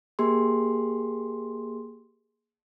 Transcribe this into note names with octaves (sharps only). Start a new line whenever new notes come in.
A#3 G4 G#4 C6